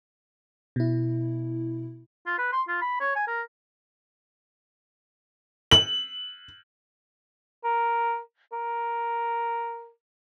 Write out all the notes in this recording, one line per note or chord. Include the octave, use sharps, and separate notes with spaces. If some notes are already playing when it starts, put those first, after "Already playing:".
B2 E4
F4
B4
C6
F4
B5
C#5
G#5
A#4
F#7
A#4
A#4